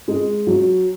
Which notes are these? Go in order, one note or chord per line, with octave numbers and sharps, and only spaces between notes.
G#3
F#3